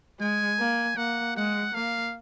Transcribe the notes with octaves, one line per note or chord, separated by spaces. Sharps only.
G#3 G#5
A#3
A#3 F#5
G#3 F#5
A#3 F5